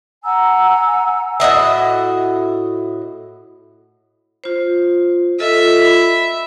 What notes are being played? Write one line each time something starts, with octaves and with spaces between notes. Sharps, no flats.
F#5 G#5 A#5 E6
A2 F#4 D#5 E5
F4 C5
F4 A4 D#5 E5
B5